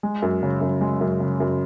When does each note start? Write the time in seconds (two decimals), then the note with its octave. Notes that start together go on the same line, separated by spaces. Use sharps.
0.03 G#3
0.22 F#2
0.43 C#3
0.61 F#2
0.81 G#3
1.01 F#2
1.20 C#3
1.40 F#2